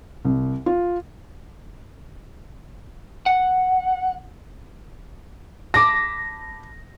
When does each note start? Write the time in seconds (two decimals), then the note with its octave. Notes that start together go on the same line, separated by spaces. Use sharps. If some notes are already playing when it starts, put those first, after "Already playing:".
0.25 C2
0.66 F4
3.26 F#5
5.74 A5 B5 D6 A#6